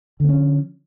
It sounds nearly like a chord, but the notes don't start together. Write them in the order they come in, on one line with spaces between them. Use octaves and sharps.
D3 C4 C#4 F3